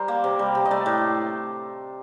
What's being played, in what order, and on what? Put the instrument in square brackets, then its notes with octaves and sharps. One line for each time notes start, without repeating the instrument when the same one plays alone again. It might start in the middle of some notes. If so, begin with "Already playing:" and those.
Already playing: [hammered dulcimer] G3 A#4 C5
A#3
C3
G3
C3
D#5
A3 D5
A2